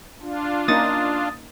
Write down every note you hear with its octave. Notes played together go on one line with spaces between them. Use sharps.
D4 F4
A#3 C#4 D#4 D#6 A6